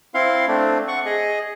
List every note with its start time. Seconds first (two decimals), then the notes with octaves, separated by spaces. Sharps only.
0.14 C4 E4 F5 C6
0.48 A3 C4 D4
0.88 F#5 C#6
1.06 G#4 D#5